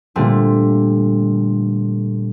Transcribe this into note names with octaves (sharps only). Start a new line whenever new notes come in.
A#2 D3 G3 A3 C4